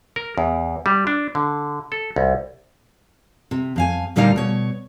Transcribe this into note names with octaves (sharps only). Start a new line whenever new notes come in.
A#4
E2
G3
D4
D3
A4
C2
C3
F2 F5 G#5
D2 A#2 G3 A#3 D#4 F5
B2 C#5